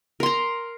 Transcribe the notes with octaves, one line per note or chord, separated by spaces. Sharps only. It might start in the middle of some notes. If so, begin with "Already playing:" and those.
A#4 A#5 C6